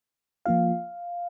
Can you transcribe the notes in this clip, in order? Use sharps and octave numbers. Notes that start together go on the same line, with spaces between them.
F3 A#3 F4 F5